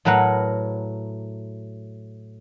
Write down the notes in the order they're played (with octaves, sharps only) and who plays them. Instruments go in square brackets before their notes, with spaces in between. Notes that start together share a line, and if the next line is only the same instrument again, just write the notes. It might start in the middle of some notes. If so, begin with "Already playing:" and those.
[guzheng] A2 F#3 A#4 B4 F#5